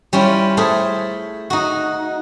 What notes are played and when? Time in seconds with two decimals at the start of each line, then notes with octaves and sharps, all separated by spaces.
0.13 G3 C#4 E4 F4
0.57 A3 G#4 A4 C5
1.50 D#4 F#4